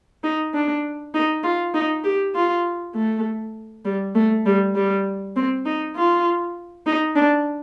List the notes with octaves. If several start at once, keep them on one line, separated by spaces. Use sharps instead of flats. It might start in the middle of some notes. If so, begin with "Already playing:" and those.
D#4
D4
D#4
F4
D#4
G4
F4
A3
G3
A3
G3
G3
C4
D#4
F4
D#4
D4